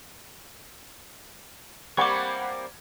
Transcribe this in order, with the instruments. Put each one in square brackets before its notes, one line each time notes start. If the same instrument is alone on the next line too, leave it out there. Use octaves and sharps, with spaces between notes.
[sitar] G3 A#3 C4 [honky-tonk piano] F#5 B5 G#6 [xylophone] C#6 D6